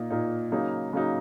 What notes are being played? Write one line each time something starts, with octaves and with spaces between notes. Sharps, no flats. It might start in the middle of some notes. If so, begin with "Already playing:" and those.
Already playing: A#2 A#3 D#4
A#2 A#3 D#4
C#3 F#3 A#3 D#4
C#3 F#3 A#3 D#4